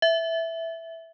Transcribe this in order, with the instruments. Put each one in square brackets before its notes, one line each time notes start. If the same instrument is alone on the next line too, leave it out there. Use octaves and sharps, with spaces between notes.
[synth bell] E5